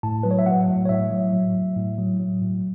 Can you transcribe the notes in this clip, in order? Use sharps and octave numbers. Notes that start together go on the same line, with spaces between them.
A2 A5
F#3 B4
C#5
E5
F#3 F#5
A2
C#5
A2 E5
F#3
F#3
A2
A2
F#3
F#3
A2